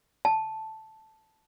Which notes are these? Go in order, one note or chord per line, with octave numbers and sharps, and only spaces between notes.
A5